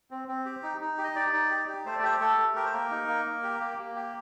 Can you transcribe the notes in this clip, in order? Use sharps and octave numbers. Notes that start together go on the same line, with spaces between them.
C4
C4
G4
D#4
D#4
G4
D#5
D#4 D5
D#4
G4
G4
A3 C5
D5
G4 C5
A3 A4
A3
G4 A#4
C5
A#3 A#4
D#4
A#3
A#3
G4
A#3
A#3
G4